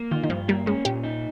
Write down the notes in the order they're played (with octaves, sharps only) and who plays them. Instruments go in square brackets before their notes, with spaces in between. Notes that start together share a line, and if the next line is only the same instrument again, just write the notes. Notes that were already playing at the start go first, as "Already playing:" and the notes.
Already playing: [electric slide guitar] A#3
[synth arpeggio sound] D#3 [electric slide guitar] F4
[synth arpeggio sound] D#3
[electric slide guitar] G2 [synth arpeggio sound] F3
[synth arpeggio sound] G3 [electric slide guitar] A#3
[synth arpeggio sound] G#3 [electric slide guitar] C#4
[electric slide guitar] A#2 [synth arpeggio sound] G4
[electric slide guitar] D#4